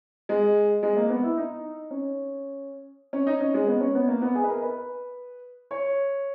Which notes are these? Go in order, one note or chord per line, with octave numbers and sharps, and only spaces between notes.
G#3
G#3
A#3
B3
E4
D#4
C#4
C#4
D#4
C#4
G#3
B3
C#4
B3
A#3
B3
G#4
B4
A#4
B4
C#5